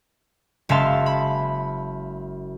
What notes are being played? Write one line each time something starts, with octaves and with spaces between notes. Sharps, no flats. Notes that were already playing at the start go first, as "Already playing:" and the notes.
F#1 G#3 E5 F5 A5 C6
B5